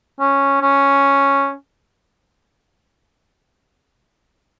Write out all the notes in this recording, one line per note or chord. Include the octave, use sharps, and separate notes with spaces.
C#4
C#4